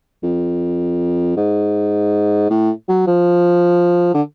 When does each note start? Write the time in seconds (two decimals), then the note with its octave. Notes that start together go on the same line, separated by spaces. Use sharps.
0.23 F2
1.36 G#2
2.50 A2
2.89 F#3
3.07 F3
4.14 D3